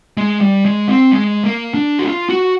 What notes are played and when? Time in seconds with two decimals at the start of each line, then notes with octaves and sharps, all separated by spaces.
0.17 G#3
0.41 G3
0.65 G#3
0.88 C4
1.12 G#3
1.44 A#3
1.74 D4
1.99 F#4
2.06 F4
2.30 F#4